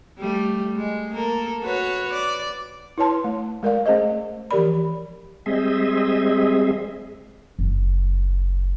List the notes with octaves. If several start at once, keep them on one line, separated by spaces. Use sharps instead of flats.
G3 A3
G#3
A#3 A4 A#4
F#4 B4 C#5
D5
E4 B4 C#5 A5 C6
A3
G#3 A#4 D5 F5
A3 C#4 G#4 C5 D#5
E3 F3 G4 A#4 D5 B5
G3 G#3 C4 G#4 D#5 E5
F#1